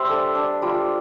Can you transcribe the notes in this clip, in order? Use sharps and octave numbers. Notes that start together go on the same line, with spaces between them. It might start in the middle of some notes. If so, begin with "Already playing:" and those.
Already playing: G3 C5 E5
D4 A4
D4
G3 F4